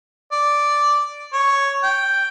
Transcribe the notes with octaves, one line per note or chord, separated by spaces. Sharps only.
D5
C#5
G5